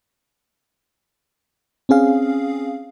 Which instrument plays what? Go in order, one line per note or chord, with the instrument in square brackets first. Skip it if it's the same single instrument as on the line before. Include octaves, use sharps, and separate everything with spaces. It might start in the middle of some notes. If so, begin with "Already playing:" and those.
[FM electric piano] C4 C#4 G#4 F5